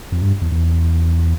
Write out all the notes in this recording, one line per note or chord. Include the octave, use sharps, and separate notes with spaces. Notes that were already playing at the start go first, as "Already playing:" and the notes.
F2
G2
E2
E2